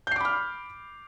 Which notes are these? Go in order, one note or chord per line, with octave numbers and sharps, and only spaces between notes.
B5 D6 F6 G6 C7